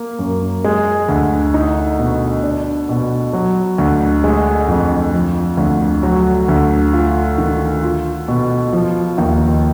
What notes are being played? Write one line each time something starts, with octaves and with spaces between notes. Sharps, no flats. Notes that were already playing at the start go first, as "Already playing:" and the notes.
Already playing: A#3
F#2
G#3
D2
D#4
B2
D4
B2
F#3
D2
G#3
F2
F3
D2
F#3
D2
F4
D#3
F4
B2
F3
D#2